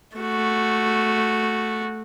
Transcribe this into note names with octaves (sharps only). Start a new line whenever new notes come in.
A3 F#4